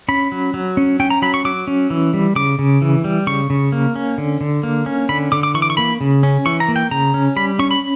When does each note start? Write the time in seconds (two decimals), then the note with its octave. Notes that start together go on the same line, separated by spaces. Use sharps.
0.08 C#4 B5
0.32 F#3
0.54 F#3
0.77 C#4
1.00 C#4 G5
1.10 A#5
1.22 F#3 B5
1.34 C#6
1.45 F#3 D6
1.67 C#4
1.90 E3
2.14 G3
2.36 C#3 D6
2.59 C#3
2.82 E3
3.04 G3
3.27 C#3 C#6
3.50 C#3
3.72 A#3
3.96 C#4
4.18 D3
4.41 D3
4.63 A#3
4.86 C#4
5.09 D3 B5
5.32 D3 D6
5.43 D6
5.54 E3 C#6
5.62 D6
5.70 C#6
5.77 A#3 B5
6.01 C#3
6.23 C#4
6.46 E3 C#6
6.60 A#5
6.68 A#3
6.76 G5
6.91 C#3 A#5
7.14 C#4
7.36 G3 B5
7.59 C#4 C#6
7.71 B5